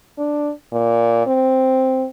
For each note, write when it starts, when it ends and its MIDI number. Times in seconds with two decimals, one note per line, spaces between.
0.18 0.51 62
0.72 1.26 46
1.27 2.06 60